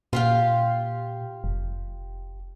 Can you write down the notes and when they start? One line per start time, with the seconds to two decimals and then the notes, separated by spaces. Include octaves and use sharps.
0.13 A#2 F4 G4 F5
1.44 F1